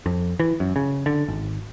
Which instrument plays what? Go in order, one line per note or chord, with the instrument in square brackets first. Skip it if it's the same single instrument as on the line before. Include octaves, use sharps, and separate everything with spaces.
[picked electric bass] F2
E3
F#2
C#3
D3
G#1